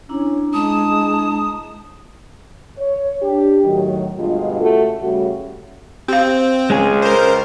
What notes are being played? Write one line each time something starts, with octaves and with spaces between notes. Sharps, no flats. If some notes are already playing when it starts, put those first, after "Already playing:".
C#4 D4 E4 A#5
G#3 A5 D#6
C#5
D4 G4
A2 D#3 F#3
D2 G2 B2 G#3 F4
C#3 A3 F#4 A4
C#3 G3 A3 F#4
C4 G4 F5
C#2 G#3 C#4 G#4
A#4 C5